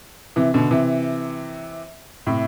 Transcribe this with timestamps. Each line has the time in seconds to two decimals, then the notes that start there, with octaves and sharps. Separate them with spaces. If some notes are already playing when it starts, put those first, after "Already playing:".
0.36 C3 E3
0.54 B2 D3
0.71 C3 E3
2.27 A2 C3